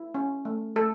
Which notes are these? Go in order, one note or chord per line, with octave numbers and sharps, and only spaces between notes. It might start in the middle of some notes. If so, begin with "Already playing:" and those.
Already playing: E4
C#4
A3
A3 A4